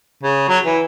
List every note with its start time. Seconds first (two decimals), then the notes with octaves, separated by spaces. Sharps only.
0.23 C#3
0.49 F#3
0.65 E3